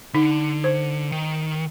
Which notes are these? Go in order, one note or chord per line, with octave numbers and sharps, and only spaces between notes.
D3 D#4
C5
D#3